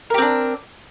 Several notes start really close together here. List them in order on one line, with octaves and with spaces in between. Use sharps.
A#4 G4 C4 D4